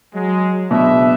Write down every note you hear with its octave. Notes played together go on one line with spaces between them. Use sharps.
F#3 G#3
F#1 B2 D4 E5